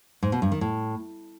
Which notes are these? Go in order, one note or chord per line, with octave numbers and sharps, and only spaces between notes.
G#2
B2
G2
D#3
A2